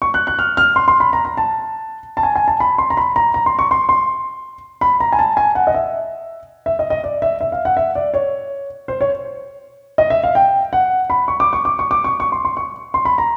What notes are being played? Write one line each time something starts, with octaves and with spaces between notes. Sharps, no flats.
C#6
F#6
F#6
F6
F6
C6
C6
B5
A#5
A#5
A5
A5
G#5
G#5
A5
B5
C6
A#5
B5
A#5
A#5
C6
C#6
C6
C6
B5
A#5
G#5
A5
G#5
F#5
D#5
E5
E5
D#5
D#5
D5
E5
E5
F5
F#5
E5
D5
C#5
C5
C#5
D#5
E5
F5
G5
F#5
B5
C#6
D6
C#6
D6
C#6
D6
C#6
C#6
C6
C6
C#6
C6
B5
A#5